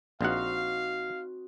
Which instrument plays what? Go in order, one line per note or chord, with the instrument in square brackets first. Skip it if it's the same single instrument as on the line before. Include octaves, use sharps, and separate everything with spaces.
[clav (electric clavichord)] A#1 F#5 [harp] C4 D#4 F#4 [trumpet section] F5